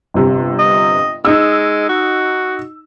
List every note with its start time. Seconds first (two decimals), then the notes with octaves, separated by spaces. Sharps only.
0.14 G1 C3
0.59 D#5
1.25 G#3 D#4 E6
1.89 F#4